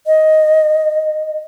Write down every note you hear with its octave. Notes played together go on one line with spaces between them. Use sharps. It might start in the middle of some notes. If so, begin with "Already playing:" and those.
D#5